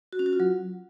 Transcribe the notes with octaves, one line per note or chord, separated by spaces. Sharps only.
F#4
C#4
F#4
F4
F#3